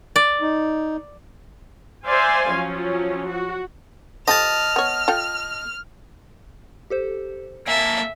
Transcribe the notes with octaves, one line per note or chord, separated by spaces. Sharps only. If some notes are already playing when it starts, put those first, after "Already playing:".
D5
D#4
C5 D5 E5 F5 G#5 C6
F3 F#3 C#4
F#4
F3 G4 A4 D#5 A5 F6
B3 C#5
F4 A4 G5
G4 A4 C5
A#3 A4 E5 G#5